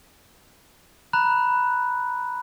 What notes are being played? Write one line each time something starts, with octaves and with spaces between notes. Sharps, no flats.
A#5 B5 F#6